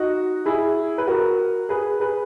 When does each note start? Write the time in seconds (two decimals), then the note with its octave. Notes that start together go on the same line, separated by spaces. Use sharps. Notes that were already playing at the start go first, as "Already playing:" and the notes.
Already playing: D#4 F#4
0.46 E4 G#4
0.98 B4
1.08 F#4 A#4
1.69 G#4 B4
2.00 G#4 B4